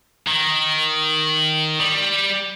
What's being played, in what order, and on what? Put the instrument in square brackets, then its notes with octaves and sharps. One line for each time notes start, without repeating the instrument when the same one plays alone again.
[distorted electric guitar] D#3
G3